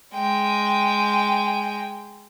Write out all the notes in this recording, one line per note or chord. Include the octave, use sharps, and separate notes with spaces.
G#3 G5